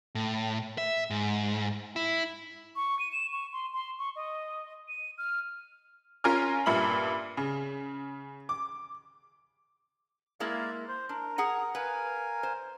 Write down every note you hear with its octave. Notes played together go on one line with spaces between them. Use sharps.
A2
E5
G#2
E4
C#6
D#7
E7
C#6
C6
C6
C#6
D#5
D#7
F6
C#4 F4 A#4 G#5 F6
G2 A#2 E5 B5 F#7
C#3
D6
G#3 A#3 E4 D5 F5
C5
D4 A#4
G#4 F#5 A#5
A#4 B4 F5 G#5
C5